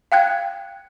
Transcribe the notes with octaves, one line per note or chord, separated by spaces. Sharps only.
F5 G5 F#6 G#6